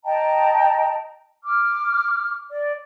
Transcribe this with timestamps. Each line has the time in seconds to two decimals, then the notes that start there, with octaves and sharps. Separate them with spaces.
0.05 D#5 G5 A5 A#5
1.44 D6 F6
2.51 D5